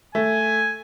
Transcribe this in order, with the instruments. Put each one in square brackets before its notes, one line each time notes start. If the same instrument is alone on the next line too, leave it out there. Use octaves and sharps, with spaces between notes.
[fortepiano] A3 [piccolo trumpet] G#5